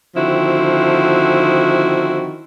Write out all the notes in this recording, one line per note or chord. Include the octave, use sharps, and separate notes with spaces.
D3 D#3 F3 C4 E4 F#4